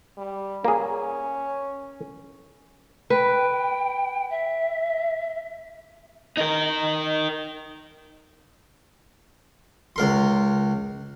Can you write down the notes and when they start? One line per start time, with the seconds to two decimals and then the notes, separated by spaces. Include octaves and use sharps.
0.17 G3
0.65 A#3 C#4 G#4
3.10 B4 G5
4.30 E5
6.37 D#4 A#4
9.96 C#2 A#4 C6